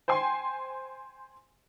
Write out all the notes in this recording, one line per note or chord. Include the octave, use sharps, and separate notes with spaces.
C5 G5 G#5 C6